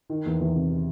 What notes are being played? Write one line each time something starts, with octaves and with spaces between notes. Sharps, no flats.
D#3
E2
E2
C3
D#3